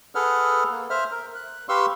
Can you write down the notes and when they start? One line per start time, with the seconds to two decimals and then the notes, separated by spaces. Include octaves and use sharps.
0.15 G#4 A4 B4 F#5 F6
0.71 A#3
0.90 C5 E5 F6
1.11 A#4
1.35 F#6
1.69 G4 B4 F5 C6 C#6 E6